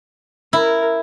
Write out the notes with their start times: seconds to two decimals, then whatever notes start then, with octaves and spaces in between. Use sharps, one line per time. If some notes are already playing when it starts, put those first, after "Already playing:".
0.53 E4 A#4